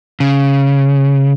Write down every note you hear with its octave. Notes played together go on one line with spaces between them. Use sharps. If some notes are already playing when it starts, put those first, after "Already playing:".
C#3